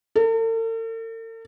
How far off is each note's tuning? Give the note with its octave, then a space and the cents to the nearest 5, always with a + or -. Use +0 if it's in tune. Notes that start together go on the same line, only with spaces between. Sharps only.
A4 +45